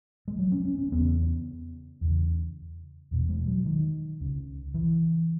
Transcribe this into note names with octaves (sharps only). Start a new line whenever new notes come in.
G#3
F#3
C#4
C#4
C#4
E2 C#3 B3
E2 C#3
E2 B2
G#3
F#3
D#3
C#2 C#3
E3